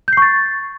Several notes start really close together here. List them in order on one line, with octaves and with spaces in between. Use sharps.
G6 C7 C#6 A6